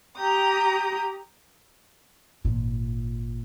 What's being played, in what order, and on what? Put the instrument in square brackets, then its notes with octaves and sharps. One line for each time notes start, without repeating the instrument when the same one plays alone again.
[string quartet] G4 G5 A#5 D#6
[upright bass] G#1 A#2